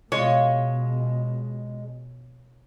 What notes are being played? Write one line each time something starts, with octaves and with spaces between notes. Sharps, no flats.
B2 G#3 F4 C#5